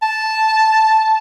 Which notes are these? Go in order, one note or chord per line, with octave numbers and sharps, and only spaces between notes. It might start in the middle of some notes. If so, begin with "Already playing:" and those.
A5